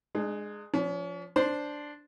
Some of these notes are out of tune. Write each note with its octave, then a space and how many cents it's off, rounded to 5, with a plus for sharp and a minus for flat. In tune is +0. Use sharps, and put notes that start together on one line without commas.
G#3 +0 D4 +40
F3 +0 C#4 +40
D4 +0 C5 +0